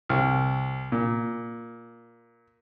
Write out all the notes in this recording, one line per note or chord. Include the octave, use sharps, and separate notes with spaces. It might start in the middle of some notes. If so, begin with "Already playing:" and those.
C2
A#2